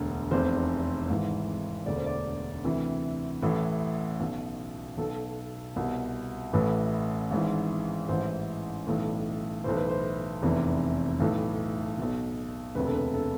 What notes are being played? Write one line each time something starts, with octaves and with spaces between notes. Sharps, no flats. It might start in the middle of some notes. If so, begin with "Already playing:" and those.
Already playing: E1 D2 D3
F1 E2 C3 C5
G#1 G#2 E3
E1 D2 D3 D5
C5
D5
D2 C3 E3
A1 A2 E3
B1 B2
B1 B2 A4
C2 B2
A1 A2 E3 B4
G#1 G#2 E3
A1 G#2 E3 C5
B1 A2 E3
B1 A2 E3 C5
B4
C5
F1 E2 C3 E3
B1 A2 E3
B1 B2
E1 D2 C3 B4
A4
B4
A4